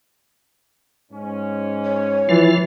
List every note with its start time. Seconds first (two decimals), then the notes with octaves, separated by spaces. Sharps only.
1.12 G#2 C#4
1.84 C#5
2.29 E3 F3 F4